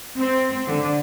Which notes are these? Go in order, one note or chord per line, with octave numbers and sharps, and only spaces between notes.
C4
D3